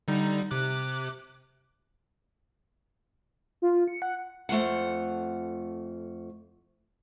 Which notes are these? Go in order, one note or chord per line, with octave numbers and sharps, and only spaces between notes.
D3 G3 D#4
C3 D6 F#6
F4
C#7
F#5
F2 A3 F4 F#5